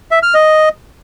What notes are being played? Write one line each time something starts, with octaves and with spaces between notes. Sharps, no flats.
E5
F6
D#5